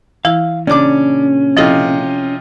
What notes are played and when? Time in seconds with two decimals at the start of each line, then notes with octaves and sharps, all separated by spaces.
0.25 E3 E4 F5
0.67 A#2 C#3 C#4 D4 D5 D6
1.57 C3 F3 E4 F4 A4 D#5